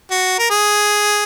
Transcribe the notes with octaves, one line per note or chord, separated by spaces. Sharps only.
F#4
A#4
G#4